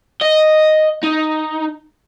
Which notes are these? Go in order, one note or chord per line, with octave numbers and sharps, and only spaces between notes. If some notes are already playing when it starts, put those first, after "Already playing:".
D#5
D#4